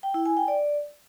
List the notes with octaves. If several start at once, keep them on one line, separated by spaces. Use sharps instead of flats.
G5
E4
G#5
G5
D5